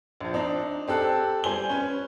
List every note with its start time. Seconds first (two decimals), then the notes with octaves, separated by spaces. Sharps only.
0.21 A#1 F3
0.33 C4 D4 D#4
0.88 C4 G4 A4 F#6
1.44 G3 C5 G#5 G7
1.70 C#4 B4